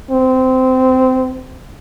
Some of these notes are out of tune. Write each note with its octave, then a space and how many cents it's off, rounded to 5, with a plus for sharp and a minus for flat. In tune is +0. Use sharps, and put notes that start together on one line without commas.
C4 -20